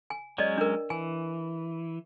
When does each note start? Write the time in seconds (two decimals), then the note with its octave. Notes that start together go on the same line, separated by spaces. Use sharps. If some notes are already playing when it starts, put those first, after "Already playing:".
0.10 G#5
0.38 F#3 G#3 C#4 D5 D#5
0.58 D4 A#4
0.90 E3 G#5